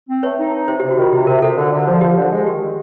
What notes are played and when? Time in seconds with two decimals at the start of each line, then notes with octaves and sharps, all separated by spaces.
0.09 C4
0.23 A3 B4 C#5
0.38 D#4
0.53 D#4
0.68 C3 C5
0.80 G4
0.83 C3
0.90 F#4
0.97 D#3 F4
1.12 C3 G4
1.27 C3 A#4
1.42 C3 A4
1.57 D3
1.72 D3
1.87 F3
2.01 F3 G4
2.17 D3
2.32 G#3
2.46 D#3 G4